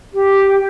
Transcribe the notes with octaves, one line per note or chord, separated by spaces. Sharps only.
G4